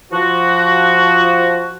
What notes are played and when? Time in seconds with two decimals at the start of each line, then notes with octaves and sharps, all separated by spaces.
0.12 F3 F#4